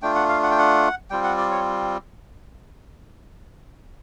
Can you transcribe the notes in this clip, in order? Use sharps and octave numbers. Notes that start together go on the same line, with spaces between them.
A3 D4 F4 G5
F#5
F5
F#5
G5
F#5
G3 C4 F4 G5
F#5
D5
C#5